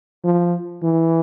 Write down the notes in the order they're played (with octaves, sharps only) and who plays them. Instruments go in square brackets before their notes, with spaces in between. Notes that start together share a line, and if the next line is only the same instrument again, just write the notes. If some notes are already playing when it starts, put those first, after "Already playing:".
[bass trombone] F3
E3